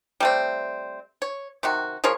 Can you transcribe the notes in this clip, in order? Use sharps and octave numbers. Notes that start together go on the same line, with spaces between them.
G3 A3 C4
C#5
C3 D#3 F#4
F3 G#4 A#4 C#5